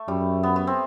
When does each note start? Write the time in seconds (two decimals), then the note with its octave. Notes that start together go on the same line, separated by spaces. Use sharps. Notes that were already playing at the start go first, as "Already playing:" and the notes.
Already playing: A3
0.08 F#2 G3
0.43 B3
0.56 B3
0.67 C4